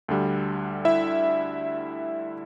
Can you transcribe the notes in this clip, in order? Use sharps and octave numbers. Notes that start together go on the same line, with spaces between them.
D2 D3 G3
E4 E5